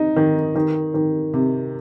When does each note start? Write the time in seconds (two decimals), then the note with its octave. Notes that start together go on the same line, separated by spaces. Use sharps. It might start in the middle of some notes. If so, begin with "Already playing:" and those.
Already playing: D#4
0.16 D#3
0.55 D#3
0.94 D#3
1.34 C3